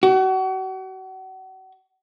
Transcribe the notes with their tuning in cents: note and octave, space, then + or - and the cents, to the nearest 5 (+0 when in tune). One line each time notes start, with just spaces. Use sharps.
F#4 +35